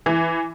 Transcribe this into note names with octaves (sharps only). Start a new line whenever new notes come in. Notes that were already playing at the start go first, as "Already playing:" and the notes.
E3